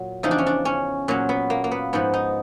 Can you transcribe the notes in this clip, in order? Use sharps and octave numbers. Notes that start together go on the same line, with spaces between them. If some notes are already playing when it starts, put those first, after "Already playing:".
Already playing: A#2 F#3
E2 C#3 F3 D#4
D4
C#4
D4
C#4
A#2 F#3 C#4
B3
A#3
A#3
B3
G#2 F3 B3
D#4